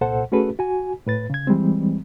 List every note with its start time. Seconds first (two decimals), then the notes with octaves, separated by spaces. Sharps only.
0.01 C2 A#2 A4 C5 F#5
0.32 A3 C#4 F#4 G#4 A4 B4
0.59 F#4 G#5
1.07 A2 B4 A6
1.30 C#3 G#6
1.47 E3 G3 G#3 C4